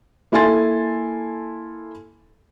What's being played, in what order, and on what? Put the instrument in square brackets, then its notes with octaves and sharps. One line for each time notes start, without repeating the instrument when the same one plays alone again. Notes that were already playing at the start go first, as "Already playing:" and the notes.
[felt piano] A#3 E4 A4 G#5 C6 A6